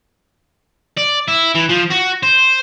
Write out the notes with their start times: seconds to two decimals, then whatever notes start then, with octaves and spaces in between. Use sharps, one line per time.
0.98 D5
1.28 E4
1.55 E3
1.70 F3
1.91 F#4
2.23 C5